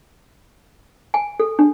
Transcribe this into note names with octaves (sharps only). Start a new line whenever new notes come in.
G#5
A4
D4